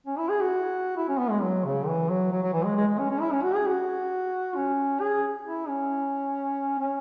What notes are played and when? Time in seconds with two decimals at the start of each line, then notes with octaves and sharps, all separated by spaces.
0.07 C#4
0.18 E4
0.29 G#4
0.40 F#4
0.97 E4
1.09 C#4
1.19 B3
1.30 G#3
1.42 F#3
1.65 C#3
1.87 E3
2.10 F#3
2.32 F#3
2.43 F#3
2.53 E3
2.65 G#3
2.76 G#3
2.88 G#3
2.99 C#4
3.10 C#4
3.21 E4
3.33 C#4
3.43 F#4
3.55 G#4
3.66 F#4
4.56 C#4
5.01 G#4
5.45 E4
5.68 C#4
6.79 C#4